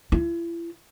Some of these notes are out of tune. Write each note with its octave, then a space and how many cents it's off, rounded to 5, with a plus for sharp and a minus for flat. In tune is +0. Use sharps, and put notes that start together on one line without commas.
E4 +40